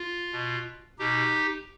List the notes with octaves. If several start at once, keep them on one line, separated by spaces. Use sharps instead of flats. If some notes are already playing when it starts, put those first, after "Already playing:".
Already playing: F4
B2
B2 D#4 G4